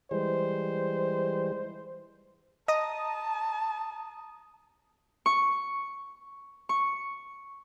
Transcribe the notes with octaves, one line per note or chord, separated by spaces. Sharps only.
E3 G3 G#3 C5
D#5 A5 A#5 D#6
C#6
C#6